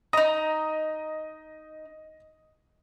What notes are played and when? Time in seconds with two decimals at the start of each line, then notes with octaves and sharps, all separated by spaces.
0.13 D#4 D#5 A#5 D#6